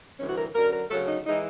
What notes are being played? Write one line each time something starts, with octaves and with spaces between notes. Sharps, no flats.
D2 C3 E3 G3 C#4
F#4
A#4
F#2 D3 F#3 A#4
A#4
D2 C#3 F#3 A4
D#4
E3 G#3 D#4